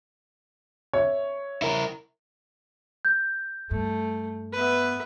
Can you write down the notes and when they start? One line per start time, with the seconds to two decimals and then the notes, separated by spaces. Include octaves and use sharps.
0.93 C#5 E5
1.62 E4 A#4
3.05 G6
3.71 G2 A3
4.52 B3 B4 E5